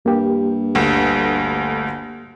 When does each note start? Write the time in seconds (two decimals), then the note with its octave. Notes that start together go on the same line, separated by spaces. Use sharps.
0.06 G2 A#3 G4
0.75 G1 D2